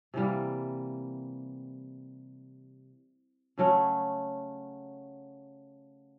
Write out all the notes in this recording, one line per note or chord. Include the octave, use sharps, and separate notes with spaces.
C3 E3 G3 A#3
C#3 F#3 A3 C#4